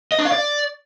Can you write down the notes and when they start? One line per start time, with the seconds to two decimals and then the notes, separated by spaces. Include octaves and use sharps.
0.12 D#5
0.19 D4
0.25 F5
0.32 D5